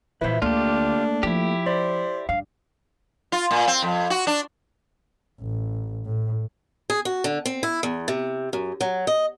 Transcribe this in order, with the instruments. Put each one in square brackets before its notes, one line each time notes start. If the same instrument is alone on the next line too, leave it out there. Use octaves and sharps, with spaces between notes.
[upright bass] A#2 E3 [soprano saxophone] E4 [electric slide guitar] B4 C5 E5
[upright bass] D2 [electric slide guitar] A3 A#3 [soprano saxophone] D4 [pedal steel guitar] F4 G4
[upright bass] F3 [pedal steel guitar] E4 G4
[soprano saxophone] C5 [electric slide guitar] D5
[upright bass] G2 [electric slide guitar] F5
[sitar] F4
A#2
C4
F2
F#4
D4
[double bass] A1
A2
[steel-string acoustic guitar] G#4
F#4
D3
C4
E4
E2
C3
F#2
F#3
D#5